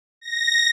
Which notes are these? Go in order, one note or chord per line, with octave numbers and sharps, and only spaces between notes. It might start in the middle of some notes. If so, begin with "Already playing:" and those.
A#6